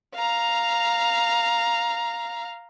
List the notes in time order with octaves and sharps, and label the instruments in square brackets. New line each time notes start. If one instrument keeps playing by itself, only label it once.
[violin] F5 A#5